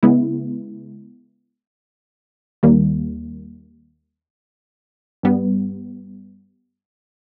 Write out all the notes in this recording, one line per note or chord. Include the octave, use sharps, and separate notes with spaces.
C#3 G#3 B3 E4
D#2 D#3 G3 A#3
G2 G3 B3